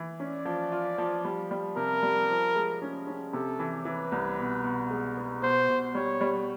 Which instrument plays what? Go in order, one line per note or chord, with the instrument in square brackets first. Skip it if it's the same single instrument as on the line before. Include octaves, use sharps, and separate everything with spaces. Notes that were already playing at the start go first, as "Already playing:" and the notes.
Already playing: [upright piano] E3
[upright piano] C#4 [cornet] D5
[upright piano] F3
F4
F3
G3
G3
[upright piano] C3 [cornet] A#4
[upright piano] G3
F3
G#3
C#4
C#4
[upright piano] C3 [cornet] A4
[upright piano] E3
[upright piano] E3 [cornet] B4
[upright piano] C2
B2
B2
G#3
B3
[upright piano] B2 [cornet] C5
[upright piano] B2
[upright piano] G3 [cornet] C#5
[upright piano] G3